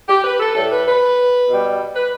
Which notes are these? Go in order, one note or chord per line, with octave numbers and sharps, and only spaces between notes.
G4
B4
A4
A2 G3 A4
B4
B4
B2
G3
B4